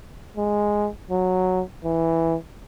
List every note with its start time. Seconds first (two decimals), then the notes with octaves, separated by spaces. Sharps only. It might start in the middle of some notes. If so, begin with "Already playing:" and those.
0.37 G#3
1.10 F#3
1.84 E3